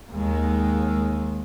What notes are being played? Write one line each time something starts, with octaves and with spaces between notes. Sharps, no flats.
D#2 G#3